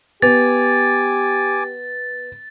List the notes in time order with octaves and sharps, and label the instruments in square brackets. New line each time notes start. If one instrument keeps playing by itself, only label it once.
[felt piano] B3 [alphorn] G4 [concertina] G#5 D6 [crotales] A6